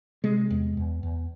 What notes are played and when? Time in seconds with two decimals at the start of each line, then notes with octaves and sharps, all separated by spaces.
0.24 C3 G#3
0.50 E2
0.77 E2
1.03 E2